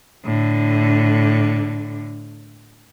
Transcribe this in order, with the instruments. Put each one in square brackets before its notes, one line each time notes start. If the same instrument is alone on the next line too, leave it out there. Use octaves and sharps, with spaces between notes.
[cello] A2 D3